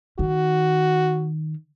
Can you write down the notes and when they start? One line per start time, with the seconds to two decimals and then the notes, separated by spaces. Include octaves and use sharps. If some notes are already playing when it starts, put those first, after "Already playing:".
0.19 D#3 F#4